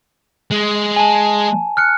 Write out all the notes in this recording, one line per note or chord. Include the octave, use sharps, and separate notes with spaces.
G#3
G#5 A5
F6 F#6 C#7